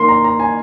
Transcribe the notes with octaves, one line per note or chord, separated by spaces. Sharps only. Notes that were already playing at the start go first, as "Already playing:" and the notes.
Already playing: D#3 A#3 C6
A#5
A#5
G#5